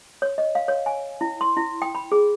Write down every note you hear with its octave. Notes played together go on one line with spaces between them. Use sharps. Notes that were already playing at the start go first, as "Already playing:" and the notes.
C#5
D#5
F5
C#5
G#5
E4
C6
E4
G5
B5
G#4